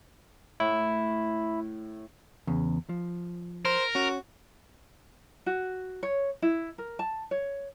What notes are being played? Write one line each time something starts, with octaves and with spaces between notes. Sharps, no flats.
A2 E4
E2 C#3
F3
A#4 C5
C#4 F#4
F#4
C#5
E4
A#4
A5
C#5